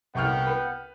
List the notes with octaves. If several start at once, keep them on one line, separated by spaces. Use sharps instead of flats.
C2 B3 F#5 G5 C#6 F6
B4